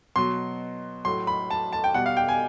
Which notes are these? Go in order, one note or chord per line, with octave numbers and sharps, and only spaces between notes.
B2 F#3 C6
A2 F#3 C6
B5
A5
A5
G5
B2 G3 F#5
F5
G5
G#5